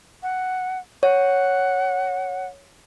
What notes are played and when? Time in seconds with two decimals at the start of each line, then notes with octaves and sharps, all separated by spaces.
0.23 F#5
1.03 C#5 F#5